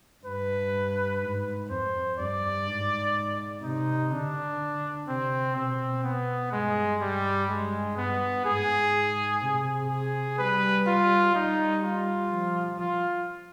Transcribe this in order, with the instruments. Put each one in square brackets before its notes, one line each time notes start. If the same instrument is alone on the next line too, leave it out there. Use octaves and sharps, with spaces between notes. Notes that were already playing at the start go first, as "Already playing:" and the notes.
[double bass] G2 [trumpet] B4
[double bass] G#2
[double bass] F2 [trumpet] C5
[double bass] G2 [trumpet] D5
[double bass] G#2
[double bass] C3 [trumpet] D#4
[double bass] D3 [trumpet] D4
[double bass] C3 [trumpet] C4
[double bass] B2 [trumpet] C4
[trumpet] B3
[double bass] G2 [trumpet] G#3
[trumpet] G3
G#3
[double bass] G2 [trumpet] B3
[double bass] G#2 [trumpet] G#4
[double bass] C3
[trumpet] G#4
[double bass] G3 [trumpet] B4
[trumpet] F4
[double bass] G3 [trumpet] D#4
[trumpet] F4
[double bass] F3
[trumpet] F4